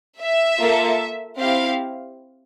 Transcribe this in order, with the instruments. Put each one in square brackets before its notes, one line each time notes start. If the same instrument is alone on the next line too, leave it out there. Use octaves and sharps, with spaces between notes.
[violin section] E5
A#3 F4 A4
C4 E4 G4 F5